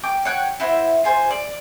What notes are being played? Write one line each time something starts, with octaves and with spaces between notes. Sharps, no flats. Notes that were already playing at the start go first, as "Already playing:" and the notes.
G5 D6
C#5 F#5 G5 F#6
E4 F#4 C5
F4 G#4 C5
D5